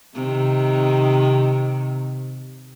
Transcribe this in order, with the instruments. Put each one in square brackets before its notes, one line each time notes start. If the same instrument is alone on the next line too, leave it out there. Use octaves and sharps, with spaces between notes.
[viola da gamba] C3 D#3